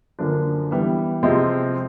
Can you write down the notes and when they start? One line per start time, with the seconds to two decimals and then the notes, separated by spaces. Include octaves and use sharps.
0.19 F#2 D3 F3 A#3 D4
0.71 E3 G3 B3
1.23 C3 F3 G#3 C4